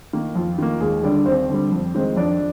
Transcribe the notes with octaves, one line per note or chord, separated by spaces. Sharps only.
D#3 A#3
F2 F4
D#3 A#3
D#2 G#3 G#4
D3 G3 D4 D5
D#2 C4 C5
D3 G3
F2
D#3 G#3 C4
F2 D4 D5